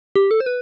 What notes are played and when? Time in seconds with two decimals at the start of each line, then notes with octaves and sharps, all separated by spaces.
0.16 G4
0.31 A4
0.40 C5
0.46 B4